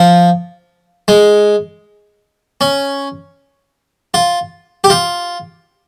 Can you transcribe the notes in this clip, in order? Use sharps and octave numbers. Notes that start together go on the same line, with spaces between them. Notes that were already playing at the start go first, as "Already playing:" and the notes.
Already playing: F3
G#3
C#4
F4
G4
F4